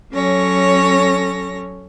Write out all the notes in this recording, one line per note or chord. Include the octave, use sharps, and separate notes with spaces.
F#3 C#4 A4 C#5 A#6